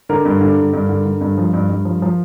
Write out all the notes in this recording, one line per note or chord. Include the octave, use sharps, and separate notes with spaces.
D3 A#4
G2
D3
D3
G2
D3
D3
G2
F3
G2
G2
F3
F3